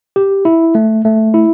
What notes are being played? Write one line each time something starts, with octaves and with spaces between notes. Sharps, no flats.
G4
E4
A3
A3
E4